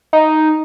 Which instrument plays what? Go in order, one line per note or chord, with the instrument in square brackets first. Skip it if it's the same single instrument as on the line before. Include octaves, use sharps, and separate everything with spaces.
[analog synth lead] D#4